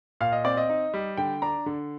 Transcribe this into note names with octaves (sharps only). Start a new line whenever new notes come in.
A#2 F5
D#5
C4 D5
D#5
D#4
G3
D3 G5
D4 A#5
D3